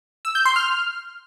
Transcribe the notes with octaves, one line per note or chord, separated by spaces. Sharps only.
E6
G6
C6
F6